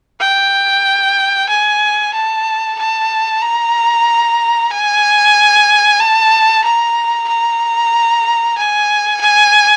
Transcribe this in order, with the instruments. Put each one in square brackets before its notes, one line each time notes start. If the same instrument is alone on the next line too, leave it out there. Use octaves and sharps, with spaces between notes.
[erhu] G5
G#5
A5
A5
A#5
G#5
A5
A#5
A#5
G#5
G#5